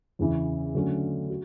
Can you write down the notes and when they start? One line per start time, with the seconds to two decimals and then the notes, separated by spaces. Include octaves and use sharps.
0.19 E2 C#3 E3
0.75 D3 F#3 A3 C#4
1.30 F#4